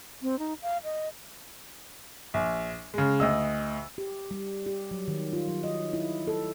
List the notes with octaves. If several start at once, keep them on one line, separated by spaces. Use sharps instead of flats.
C4
D#4
F5
D#5
A#1
C#3 G#3
D2 D#5 E6
G4
G3
G4
F#3
D#3
F4
F#3
D#5
E4
A4